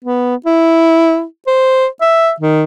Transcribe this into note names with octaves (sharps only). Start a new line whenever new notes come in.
B3
E4
C5
E5
D#3